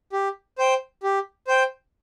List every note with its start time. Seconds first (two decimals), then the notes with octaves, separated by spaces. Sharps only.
0.13 G4
0.58 C5 G5
1.03 G4
1.47 C5 G5